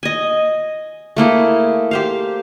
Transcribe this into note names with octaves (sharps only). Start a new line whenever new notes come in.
D#5 G#5
A3 A#3 E4 G#4
G4 C5 F5